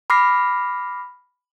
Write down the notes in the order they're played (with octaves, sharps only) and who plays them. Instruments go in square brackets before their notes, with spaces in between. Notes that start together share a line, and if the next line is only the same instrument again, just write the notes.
[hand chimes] B5 D6 F6 A#6 C7